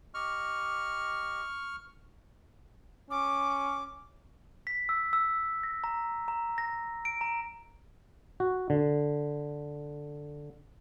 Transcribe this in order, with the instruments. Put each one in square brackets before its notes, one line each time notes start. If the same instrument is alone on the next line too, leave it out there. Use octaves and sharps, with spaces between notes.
[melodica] G4 D#5 [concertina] C#6 F6
[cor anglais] C#4 [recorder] D6
[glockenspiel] B6
E6
E6
A#6
A#5
A#5
A#6
D7
A#5
[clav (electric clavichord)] F#4
D3